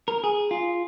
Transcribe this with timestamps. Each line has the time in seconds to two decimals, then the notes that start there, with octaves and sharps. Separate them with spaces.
0.08 A#4
0.24 G#4
0.51 F4